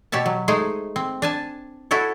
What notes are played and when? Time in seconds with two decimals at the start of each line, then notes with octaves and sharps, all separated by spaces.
0.12 B2 G4 C#5 E5 A5
0.26 F#3
0.48 G#3 A3 D#4 G#4 C5
0.96 C4
1.22 D4 G#5 A5
1.91 E4 F#4 A4 C#5